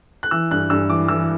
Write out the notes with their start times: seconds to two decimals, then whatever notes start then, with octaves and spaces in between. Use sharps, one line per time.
0.23 F#6
0.31 E3 E6
0.51 G2 F#6
0.70 G2 E6
0.89 E3 D6
1.08 E3 E6